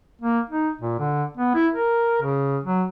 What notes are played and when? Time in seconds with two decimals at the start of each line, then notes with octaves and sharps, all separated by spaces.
0.21 A#3
0.50 D#4
0.81 A#2
0.99 D3
1.37 B3
1.55 E4
1.73 A#4
2.22 C#3
2.64 F#3